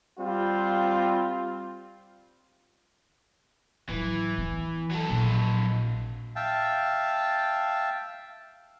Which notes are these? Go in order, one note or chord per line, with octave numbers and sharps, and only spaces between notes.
G3 C4 F4
A2 E3 F#3
B3
F#3 A4
A#1
E5 F5 G5 A5